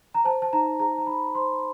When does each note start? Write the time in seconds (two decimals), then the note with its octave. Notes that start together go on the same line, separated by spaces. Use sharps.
0.14 A#5
0.25 C5 A5
0.42 A5
0.53 D#4 A#5
0.79 G#4 A#5
0.98 A#5
1.07 D#4 B5
1.35 C5 C6